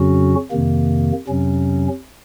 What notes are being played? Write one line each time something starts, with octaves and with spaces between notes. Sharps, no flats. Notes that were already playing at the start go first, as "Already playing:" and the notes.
Already playing: F2 C#3 F#3 C#4 F#4
F2 C3 D#3 A#3
F2 C3 F#3 C#4